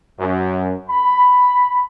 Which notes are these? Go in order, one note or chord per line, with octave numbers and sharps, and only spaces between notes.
F#2
B5